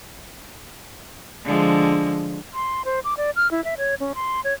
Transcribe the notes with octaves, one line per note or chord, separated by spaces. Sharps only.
D3 F3 G#3
C6
C5
D6
D5
F6
E4
E5
C#5
C#4
C6
C#5